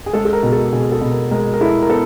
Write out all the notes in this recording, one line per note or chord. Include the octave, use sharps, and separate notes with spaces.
G#4
G#3 A4
A4
A#4
B2
A4
B2 G#4
A4
B2
A#4
G#3 A#4
A#4
E4 A4
A#4
B3 A4